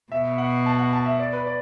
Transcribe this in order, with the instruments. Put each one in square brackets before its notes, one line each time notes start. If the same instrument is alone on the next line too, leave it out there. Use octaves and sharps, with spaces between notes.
[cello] B2 [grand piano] E5
[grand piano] F#5
A5
F#5
A5
E5
D5
B4
D5